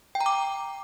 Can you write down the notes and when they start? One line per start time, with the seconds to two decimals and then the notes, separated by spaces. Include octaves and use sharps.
0.15 G5
0.21 A#5
0.26 D6